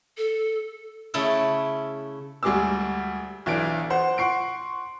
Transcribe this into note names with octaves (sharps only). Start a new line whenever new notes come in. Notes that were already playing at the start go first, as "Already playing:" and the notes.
A4
C#3 A3 E4 A4
D2 G3 G#3 G#4 D6 E6
B1 E3 D4 D7
C5 F#5
F#5 C6 C#6 C7 D7